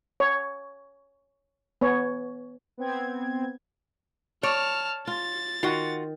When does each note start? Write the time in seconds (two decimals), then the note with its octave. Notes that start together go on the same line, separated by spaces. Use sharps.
0.20 C#5
1.81 B3 C#5
2.77 B3 C4 G#6
4.43 C#5 D5 A5 F6
5.07 F4 A6
5.63 D#3 F4 F#4 F#5